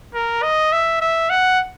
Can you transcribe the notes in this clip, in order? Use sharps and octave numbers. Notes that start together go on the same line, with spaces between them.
A#4
D#5
E5
E5
F#5